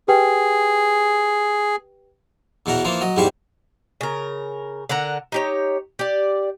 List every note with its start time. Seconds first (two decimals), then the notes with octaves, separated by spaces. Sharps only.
0.08 G4 G#4 B4 G5
2.66 E2 B2 E3 A#4 F#5
2.84 E3 F3 A#3 F4
3.01 F#3 D#5
3.16 E2 G#2 G3 G4 C5 C#6
4.01 C#3 A#4
4.89 D3 A#4 F#5 A#5
5.32 D#4 G4 C#5
5.99 G4 D5